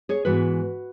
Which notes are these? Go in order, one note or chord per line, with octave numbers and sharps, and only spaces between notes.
G#4 C#5
G#2 E3 B3 F#4 B4